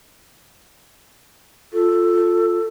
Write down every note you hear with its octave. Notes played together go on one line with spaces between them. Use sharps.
F4 A4